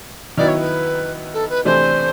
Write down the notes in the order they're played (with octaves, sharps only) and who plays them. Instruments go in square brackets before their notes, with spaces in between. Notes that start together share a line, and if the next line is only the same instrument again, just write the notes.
[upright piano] D#3 F#3 B3 E4 [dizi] D5
[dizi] C#5
B4
A4
B4
[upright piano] C3 E3 A3 D4 [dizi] C5